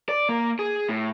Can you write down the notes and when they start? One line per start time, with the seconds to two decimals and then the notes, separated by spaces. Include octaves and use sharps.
0.09 D5
0.29 A#3
0.59 G#4
0.89 A2